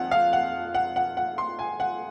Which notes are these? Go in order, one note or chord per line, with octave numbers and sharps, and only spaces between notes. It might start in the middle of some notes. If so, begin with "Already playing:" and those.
Already playing: F2 D#3 F#5
F5
F#5
F#5
F#5
F#5
C6
G#5
F#5